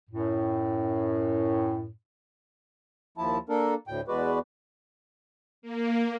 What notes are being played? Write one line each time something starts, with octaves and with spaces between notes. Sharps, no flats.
F#2 A2
D#2 F3 E4 A5
A#3 D4 A4 A#4
D2 A2 G5
E2 G#3 F#4 B4 D5
A#3